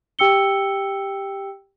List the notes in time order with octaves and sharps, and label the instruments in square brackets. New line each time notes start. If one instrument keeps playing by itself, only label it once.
[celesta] G4 G5 E6 C#7 G7